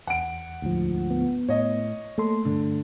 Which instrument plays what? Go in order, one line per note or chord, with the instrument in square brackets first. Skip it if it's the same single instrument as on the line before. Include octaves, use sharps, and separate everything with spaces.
[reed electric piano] E2 [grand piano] F#5 D7
[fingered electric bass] D2 G#2 F3
[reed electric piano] B3
[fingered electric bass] A2 [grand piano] C#5 D#5
[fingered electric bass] A3 [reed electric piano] A#3 A4 C6
[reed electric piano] G2 [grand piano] D3